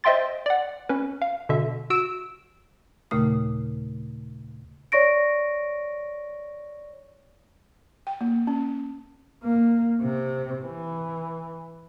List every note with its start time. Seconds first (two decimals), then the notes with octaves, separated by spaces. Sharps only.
0.04 C5 D#5 E5 G5 C6 A6
0.46 D5 F#5
0.89 C#4 B4
1.22 F5
1.49 B2 D3 E5
1.90 F#4 E6 D7 E7
3.11 D#2 A#2 C#3 A3 D#6
4.92 C#5 D5 C#6 A#6 D7
8.07 G5
8.21 A#3
8.47 C#4
9.43 A#3
10.02 C3
10.64 E3